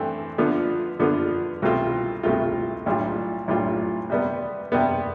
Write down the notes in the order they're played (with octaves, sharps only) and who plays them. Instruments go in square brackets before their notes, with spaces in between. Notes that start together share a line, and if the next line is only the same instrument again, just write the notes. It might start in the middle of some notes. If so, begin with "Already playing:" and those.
Already playing: [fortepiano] G2 E3 A3 C4
D3 F3 B3
D3 F3 B3
C2 B2 A3 C4 F4
C2 B2 A3 C4 F4
B1 A2 G3 D4 F4
B1 A2 G3 D4 F4
C3 G3 B3
C3 G3 B3